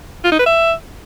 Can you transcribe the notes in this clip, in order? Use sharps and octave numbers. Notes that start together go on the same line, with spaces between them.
F4
D#4
B4
E5